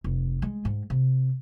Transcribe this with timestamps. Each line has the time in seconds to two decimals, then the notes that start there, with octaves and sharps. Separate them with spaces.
0.04 F1
0.42 G#3
0.65 G#2
0.90 C3